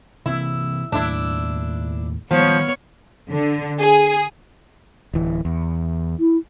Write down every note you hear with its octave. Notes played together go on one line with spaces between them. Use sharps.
C3 E3 A#3 E4
D#2 A2 D4 E4
D#3 F3 G3 G#3 B3 C#5
D3
G#4
D1 E3
E2
E4